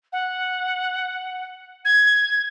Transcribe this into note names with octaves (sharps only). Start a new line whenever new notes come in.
F#5
G#6